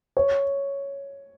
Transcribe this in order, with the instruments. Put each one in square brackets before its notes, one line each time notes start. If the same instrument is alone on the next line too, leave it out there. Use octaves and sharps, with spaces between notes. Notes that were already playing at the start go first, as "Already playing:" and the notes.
[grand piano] C#5